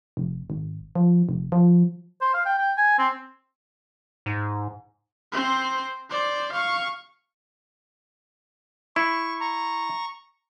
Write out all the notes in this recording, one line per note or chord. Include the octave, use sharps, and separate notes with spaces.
F1
G#1
F3
F1
F3
C5
F5
G5
G5
G#5
C4
G#2
C4 C5
C5 D5
F5 C#6
E4 C#6
A#5 C#6